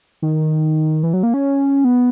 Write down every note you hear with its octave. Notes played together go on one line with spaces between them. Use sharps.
D#3
E3
F#3
A#3
C#4
B3